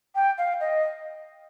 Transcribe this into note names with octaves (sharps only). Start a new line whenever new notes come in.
G5
F5
D#5